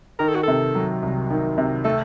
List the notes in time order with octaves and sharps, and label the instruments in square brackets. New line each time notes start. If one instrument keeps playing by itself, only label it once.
[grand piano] D#3 [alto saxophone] A#4
[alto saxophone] A4
F#4
[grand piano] C3 [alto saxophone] A4
[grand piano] F#3
C2
D#3
C3
[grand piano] A3 [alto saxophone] A4